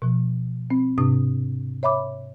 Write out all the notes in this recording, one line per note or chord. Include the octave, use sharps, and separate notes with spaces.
B2 F3
C4
G#2 C3 D4 D#6
C#5 E5 B5 D6